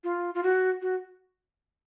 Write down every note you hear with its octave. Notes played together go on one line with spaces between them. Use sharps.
F4
F4
F#4
F#4